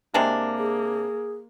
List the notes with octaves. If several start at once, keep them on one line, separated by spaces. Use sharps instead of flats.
C3 G#3 A#3 D4
G#4